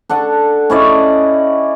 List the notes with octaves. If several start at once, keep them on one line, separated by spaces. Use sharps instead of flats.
D4 A4 F#5
C#4 E4 D5 D#5